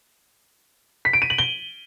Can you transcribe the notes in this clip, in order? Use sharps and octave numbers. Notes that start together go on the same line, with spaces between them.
B6
D7
D#7
F#7
G7